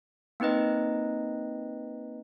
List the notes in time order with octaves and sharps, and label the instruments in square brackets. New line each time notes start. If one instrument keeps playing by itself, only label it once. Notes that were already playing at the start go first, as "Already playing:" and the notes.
[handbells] A#3 C4 D#4 B4 D#5